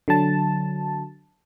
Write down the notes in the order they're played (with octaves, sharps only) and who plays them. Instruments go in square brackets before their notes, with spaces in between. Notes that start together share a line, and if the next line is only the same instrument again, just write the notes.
[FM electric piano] D3 F#3 A5